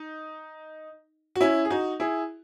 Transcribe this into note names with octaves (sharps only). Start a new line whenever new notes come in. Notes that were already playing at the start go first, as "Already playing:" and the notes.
Already playing: D#4
F#4
C#4 E4
G#4
D#4 F#4
E4 G#4